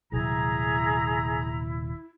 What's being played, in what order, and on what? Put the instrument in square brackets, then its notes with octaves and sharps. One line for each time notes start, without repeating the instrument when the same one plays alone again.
[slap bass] D#1 C3 F#3 [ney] E4 [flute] G#4 [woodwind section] A#5